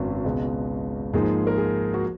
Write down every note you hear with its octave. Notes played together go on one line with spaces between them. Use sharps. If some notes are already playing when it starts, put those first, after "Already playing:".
Already playing: G#1 F#2 C#3 F#3 B3 F#4
C#2 B2 G#3 B3
G#2 F3 A#3 G#4
A#4
G#4
F#4